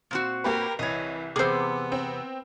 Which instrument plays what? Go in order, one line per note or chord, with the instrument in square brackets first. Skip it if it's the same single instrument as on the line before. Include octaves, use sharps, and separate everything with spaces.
[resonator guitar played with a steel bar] A#2 C4 F#4
[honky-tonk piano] A#3 G4 B4 [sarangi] A#4
[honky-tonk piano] C2 [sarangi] E3 [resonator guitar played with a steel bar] C#5 D#5
[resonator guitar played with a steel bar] E2 C3 [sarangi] B3 [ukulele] G#4 C5 [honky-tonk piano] D6 E6
[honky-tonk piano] C4